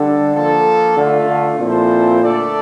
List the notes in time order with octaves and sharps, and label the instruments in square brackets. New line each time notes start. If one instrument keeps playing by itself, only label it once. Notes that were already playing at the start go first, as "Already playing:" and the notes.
Already playing: [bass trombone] D3 [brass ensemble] G3 D4 A4
[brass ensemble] F3 A#3 F4 A4
[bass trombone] D3 [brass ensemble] A3 D4 F4
[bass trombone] D3
[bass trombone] A#2 [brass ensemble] F3 C4 E4 A4 C5
[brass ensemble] D3 A3 D4 A4 D5